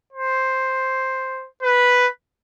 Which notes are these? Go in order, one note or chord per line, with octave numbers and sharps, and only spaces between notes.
C5
B4